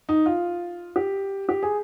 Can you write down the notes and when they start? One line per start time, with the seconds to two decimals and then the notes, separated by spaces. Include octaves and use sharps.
0.09 D#4
0.26 F4
0.96 G4
1.49 G4
1.63 G#4